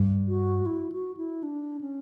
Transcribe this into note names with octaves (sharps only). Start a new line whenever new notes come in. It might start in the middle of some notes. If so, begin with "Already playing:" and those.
Already playing: G2
F#4
E4
F#4
E4
D4
C#4